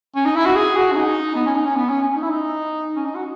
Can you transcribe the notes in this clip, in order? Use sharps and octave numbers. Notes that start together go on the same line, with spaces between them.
C#4
D#4
E4
F#4
G#4
F#4
C#4
D#4
B3
C#4
D#4
C#4
B3
C#4
C#4
D#4
E4
D#4
C#4
D#4
F#4